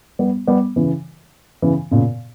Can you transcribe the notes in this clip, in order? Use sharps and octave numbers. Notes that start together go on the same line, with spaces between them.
G3 B3
G3 B3
C#3 E3
C#3 E3
A#2 C#3